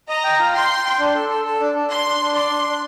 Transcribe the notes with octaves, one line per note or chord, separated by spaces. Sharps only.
D#5 A#5
G5
F4
G5 C6
G5
G5
D4
A4
A4
A4
D4
D4
D4 C6
D4
D4
D5 C6
D4
D4